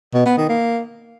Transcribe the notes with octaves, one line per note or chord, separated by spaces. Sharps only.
B2
B3
D#3
A#3